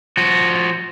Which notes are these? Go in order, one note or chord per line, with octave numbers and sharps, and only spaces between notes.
F3 F#4